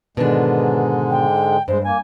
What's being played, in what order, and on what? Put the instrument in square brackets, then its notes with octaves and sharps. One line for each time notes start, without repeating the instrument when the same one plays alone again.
[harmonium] G#2 D3 G#3 [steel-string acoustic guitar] B2 D#3 D4 [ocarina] B4
[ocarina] G5
[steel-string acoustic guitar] G2 [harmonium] G#3 [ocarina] C5
[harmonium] A#3 [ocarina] G#5